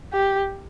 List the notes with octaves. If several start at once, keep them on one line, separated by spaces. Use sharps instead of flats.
G4